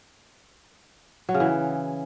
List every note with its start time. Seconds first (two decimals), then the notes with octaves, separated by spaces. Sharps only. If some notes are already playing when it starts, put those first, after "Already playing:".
1.29 F#3
1.34 C#3
1.40 E3